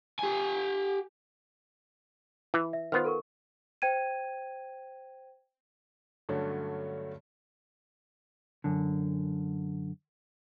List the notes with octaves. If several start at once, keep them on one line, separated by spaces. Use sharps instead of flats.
G4 G#5
E3
E5
D#3 B3 F4 C5 F6
A4 A#4 C#6
C5 G5 G#6 D#7
G2 D3 F#3 A3 C#4
F#2 D3